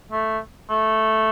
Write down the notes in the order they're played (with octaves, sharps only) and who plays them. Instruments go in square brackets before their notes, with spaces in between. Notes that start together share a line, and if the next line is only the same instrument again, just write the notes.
[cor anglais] A3
A3